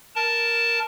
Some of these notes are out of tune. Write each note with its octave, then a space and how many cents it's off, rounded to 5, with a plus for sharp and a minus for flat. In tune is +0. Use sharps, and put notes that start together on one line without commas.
A#4 +0 A5 +0